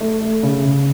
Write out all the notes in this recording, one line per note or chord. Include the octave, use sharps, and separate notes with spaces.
A3
A3
C#3
C#3